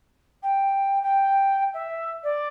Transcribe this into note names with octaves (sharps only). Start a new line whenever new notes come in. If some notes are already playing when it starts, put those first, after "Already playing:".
G5
G5
E5
D5